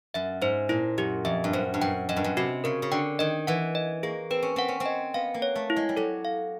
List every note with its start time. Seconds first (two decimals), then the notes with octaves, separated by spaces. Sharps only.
0.14 F#2 E5
0.41 G#2 C5
0.69 A#2 E4
0.98 F#2 G4
1.25 F2 E5
1.44 G2
1.53 F#2 C5
1.74 G2
1.81 F#2 G5
2.09 F#2 D#5
2.16 G2
2.24 F#2
2.37 C3 F#4
2.64 C#3 A#4
2.82 C#3
2.92 D3 G5
3.19 D#3 D#5
3.47 E3 F#5
3.75 D#5
4.03 A#3 G#4
4.31 C4 B4
4.42 C#4
4.56 C4 F#5
4.68 C#4
4.80 C4
4.86 D#5
5.14 B3 F5
5.34 A#3
5.42 C#5
5.55 A3
5.70 E4
5.76 G#3
5.89 G3
5.97 F#3 A4
6.25 F5